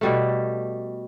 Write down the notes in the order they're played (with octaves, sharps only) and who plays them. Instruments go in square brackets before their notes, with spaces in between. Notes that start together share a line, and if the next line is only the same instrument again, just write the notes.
[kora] B2 G3 A3